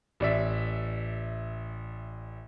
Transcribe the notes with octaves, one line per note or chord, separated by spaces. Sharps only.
A1 D5 E5